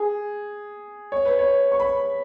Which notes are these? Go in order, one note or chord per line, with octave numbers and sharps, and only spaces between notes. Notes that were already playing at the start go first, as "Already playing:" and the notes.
Already playing: G#4
C#5
B4
C#5
C#6
B5